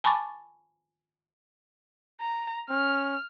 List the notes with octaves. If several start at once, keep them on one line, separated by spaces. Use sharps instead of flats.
G#5 A5 B5 C#6 D6 A6
A#5
C#4 F6